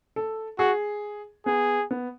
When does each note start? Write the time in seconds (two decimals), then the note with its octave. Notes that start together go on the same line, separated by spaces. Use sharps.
0.16 A4
0.59 F#4 G#4
1.46 B3 G#4
1.91 B3